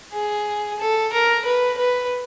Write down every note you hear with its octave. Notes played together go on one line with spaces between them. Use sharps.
G#4
A4
A#4
B4
B4